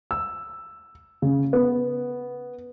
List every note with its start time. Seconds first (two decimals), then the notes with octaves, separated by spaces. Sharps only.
0.11 E6
1.22 C#3
1.53 B3